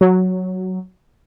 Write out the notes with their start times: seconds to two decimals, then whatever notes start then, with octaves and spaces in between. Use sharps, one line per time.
0.01 F#3